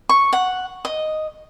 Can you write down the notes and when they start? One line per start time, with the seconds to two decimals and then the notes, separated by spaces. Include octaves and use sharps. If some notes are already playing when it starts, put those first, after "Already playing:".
0.09 C#6
0.33 F#5
0.85 D#5